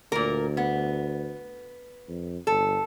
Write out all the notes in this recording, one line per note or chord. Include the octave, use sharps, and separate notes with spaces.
D2 A#2 A#4
B3
F2
G1 A4